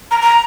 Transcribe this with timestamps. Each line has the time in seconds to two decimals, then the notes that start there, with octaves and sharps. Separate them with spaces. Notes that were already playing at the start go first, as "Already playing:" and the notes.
0.11 A#5
0.22 A#5